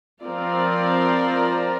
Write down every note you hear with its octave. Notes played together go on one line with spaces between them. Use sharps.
F3 C4 F4 A#4 D5